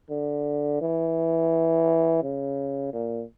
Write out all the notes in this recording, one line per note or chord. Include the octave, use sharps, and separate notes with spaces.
D3
E3
C#3
A#2